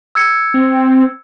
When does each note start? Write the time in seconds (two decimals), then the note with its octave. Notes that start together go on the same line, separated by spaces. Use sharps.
0.15 E6 G#6 C#7
0.54 C4